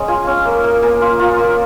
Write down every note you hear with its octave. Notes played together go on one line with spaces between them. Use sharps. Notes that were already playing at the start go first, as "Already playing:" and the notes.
Already playing: G#3 C#4 D#5
F4 G#5
C#4
A#3
A#3
A#3 G#5
F4
F4 A#5
A#3